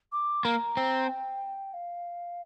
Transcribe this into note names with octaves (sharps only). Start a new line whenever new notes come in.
D6
A#3 A#5
C4
G5
F5